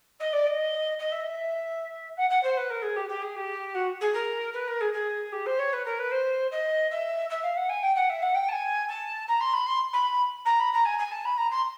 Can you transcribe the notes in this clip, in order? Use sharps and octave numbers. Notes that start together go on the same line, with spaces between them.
D#5
D5
D#5
D#5
E5
D#5
E5
F#5
F#5
C5
B4
A#4
G#4
G4
G4
G#4
G4
F#4
G#4
A#4
B4
A#4
G#4
G#4
G4
C5
C#5
B4
A#4
B4
C5
D#5
E5
E5
F5
F#5
G#5
G5
F#5
E5
F#5
G5
A5
G#5
A5
A#5
C6
B5
C6
B5
A#5
B5
A#5
G#5
G#5
A5
B5
A#5
C6